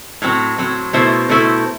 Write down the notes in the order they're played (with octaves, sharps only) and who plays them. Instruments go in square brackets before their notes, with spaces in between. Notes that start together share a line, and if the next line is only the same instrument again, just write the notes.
[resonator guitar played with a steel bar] A2 F#3 C4
A2 F#3 C4
B2 A3 E4 A4 C5
B2 A3 E4 A4 C5